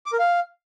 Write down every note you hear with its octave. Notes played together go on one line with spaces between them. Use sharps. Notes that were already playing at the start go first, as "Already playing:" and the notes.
D6
A#4
F5